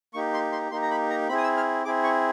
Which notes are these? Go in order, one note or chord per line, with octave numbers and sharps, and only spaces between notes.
A#3 D#4 G4 C#6
C6
C6
A#3 D#4 G4 C6
A#5
B5
A#5
C4 E4 G#4 B5
D#6
E6
F6
C4 E4 G#4 D6
C#6